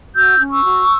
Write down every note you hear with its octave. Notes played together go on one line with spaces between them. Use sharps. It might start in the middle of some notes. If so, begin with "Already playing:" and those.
F#4 E6 G6
C#4
C#6 E6
F#4